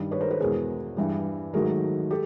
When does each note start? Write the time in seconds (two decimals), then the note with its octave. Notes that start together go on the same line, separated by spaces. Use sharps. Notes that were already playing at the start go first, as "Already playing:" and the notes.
Already playing: G2 D#3 G3
0.11 B4 C#5
0.21 A#4 C5
0.31 A4 B4
0.40 E2 B2 G#3 G#4 A#4
0.97 G2 E3 G3
1.53 G#2 D#3 F#3 A3 G#4 A#4
2.11 G4 A4